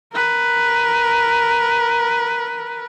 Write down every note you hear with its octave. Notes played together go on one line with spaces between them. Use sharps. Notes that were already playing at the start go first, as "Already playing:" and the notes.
A#4 B4